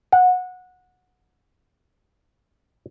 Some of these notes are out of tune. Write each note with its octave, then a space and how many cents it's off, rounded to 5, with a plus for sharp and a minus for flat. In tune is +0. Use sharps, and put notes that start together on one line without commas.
F#5 -20